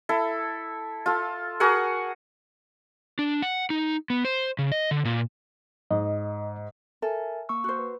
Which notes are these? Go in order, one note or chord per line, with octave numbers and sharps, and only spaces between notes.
E4 A4
F4 A4
F#4 G#4 A#4 F#5
D4
F#5
D#4
B3
C5
C#3
D#5
D3
A#2
G#2 D#5
A4 A#4 E5 G#5
A#3 C#6 E6
F#4 C5
B4